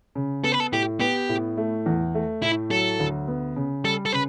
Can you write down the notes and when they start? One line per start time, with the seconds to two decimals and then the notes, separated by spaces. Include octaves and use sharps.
0.15 C#3
0.44 B3 A4
0.52 B4
0.60 A4
0.72 A2 G4
1.00 B3 G4
1.29 A2
1.57 A3
1.86 E2
2.15 A3
2.42 A2 E4
2.71 F#3 A4
3.00 D2
3.28 B3
3.56 C#3
3.84 G3 A4
4.06 A4
4.13 C#3 B4